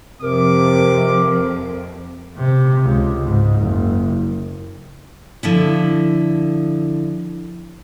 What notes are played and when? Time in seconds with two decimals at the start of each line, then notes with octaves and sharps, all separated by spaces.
0.22 F2 C3 A#4 D6
2.37 C3
2.83 C#2
3.22 G#2
3.59 F#1
5.43 D3 F3 E4